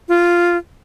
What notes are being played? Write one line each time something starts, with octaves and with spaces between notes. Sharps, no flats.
F4